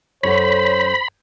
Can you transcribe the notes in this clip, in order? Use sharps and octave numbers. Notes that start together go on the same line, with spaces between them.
F#2 A4 C5 C#5 F#5 B5